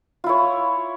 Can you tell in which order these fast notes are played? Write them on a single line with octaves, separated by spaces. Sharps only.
F4 E4 C#5